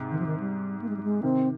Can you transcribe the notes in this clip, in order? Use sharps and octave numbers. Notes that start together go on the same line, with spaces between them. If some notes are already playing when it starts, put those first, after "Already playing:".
Already playing: G#2 C3
D#3
F3
D#3
G3
A#3
G#3
G3
G#3
C3 D#3 C4